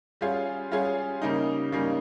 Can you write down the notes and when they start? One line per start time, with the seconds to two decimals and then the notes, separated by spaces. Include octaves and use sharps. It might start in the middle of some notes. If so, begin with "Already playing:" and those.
0.21 G3 C#4 F4 G#4
0.71 G3 C#4 F4 G#4
1.22 C#3 G3 A#3 D#4
1.72 C#3 G3 A#3 D#4